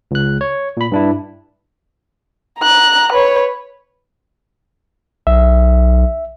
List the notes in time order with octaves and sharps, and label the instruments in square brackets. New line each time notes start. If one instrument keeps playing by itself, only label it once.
[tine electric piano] C#2 F#6
C#5
A#2 B5
G2 D4 E4
[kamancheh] A#5 F#6
B4 C#5
[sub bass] B1 [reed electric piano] E5